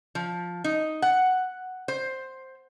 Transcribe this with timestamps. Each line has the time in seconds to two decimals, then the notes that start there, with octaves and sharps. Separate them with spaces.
0.15 F3
0.64 D#4
1.02 F#5
1.88 C5